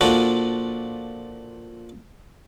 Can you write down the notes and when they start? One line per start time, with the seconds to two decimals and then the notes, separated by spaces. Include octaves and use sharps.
0.01 A#2 F3 D4 F#4 A4